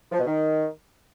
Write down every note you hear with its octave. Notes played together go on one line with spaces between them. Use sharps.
F3
B2
D#3